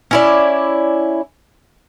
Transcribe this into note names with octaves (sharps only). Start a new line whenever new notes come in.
C#4 E4 D5